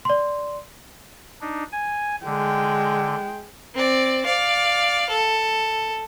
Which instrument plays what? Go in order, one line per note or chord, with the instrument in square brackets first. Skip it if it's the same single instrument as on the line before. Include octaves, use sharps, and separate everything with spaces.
[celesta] D5 C6
[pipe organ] D4 D#4
G#5
[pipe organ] D3 [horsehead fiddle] G#3 G5
[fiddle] C4 D5
D5 F5
A4